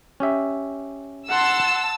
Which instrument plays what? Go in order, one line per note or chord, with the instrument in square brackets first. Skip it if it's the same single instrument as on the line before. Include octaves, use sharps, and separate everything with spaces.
[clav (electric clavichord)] C#4 G4 E5
[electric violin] F#5 C6 [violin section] A5 E6